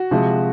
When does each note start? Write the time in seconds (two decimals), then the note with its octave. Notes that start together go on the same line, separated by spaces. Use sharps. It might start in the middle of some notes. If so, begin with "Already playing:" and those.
Already playing: F#4
0.11 C3 F3 G#3